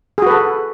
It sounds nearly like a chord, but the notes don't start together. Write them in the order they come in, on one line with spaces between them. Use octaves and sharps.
G#4 F#4 B4 A4